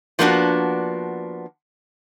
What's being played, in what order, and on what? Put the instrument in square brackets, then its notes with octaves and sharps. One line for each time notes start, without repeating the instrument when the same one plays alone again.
[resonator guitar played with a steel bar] F3 A#3 B3 D4 F#4